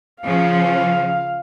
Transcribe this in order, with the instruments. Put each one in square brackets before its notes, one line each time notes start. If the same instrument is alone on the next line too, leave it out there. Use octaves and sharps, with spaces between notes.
[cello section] C#3 F3 C#4 [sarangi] F5